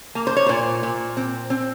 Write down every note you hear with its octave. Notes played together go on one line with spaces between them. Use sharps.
A#3
C5
C#5
A#2 C5
A#2
C4
C4